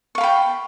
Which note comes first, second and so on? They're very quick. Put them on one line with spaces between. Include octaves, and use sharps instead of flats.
C#6 F5 B5 G5